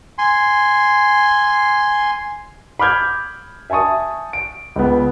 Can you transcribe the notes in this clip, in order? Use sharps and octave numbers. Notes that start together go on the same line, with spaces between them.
G#5 C6
B5 D6 F6 G6 G#6
E5 G#5 A5 C#6 D#6
D7
C#2 B3